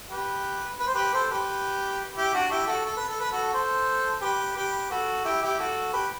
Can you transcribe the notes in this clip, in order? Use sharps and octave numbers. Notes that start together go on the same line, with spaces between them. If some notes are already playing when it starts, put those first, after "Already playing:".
G4 B4
B4
C5
G4 B4
A4 C5
G4 B4
E4 G4
D4 F#4
E4 G4
F#4 A4
A4
B4
A4
B4
F#4 A4
A4 C5
G4 B4
G4 B4
F#4 A4
E4 G4
E4 G4
F#4 A4
G4 B4